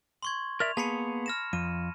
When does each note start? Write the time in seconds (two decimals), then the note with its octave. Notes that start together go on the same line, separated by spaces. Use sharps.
0.23 C6 C#6 G#6
0.60 A#4 D5 E5 F7
0.77 A#3 B3 G#4 A5 B5 C#7
1.26 F6 A#6 E7
1.53 F2 D#7